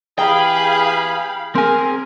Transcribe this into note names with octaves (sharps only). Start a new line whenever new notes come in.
E3 G4 G#4 F5 G5 B5
C4 G#4 A#4 G#5